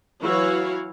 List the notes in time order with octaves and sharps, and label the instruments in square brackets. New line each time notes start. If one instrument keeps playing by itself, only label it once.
[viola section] E3 F#3 E4 F#4 C#5 F5